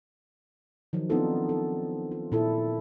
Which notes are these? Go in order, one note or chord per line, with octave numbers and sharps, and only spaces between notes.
D#3 F3 F#3
B3 C4 D4 D#4 F4 A4
A4
F4
A#2 E4 A4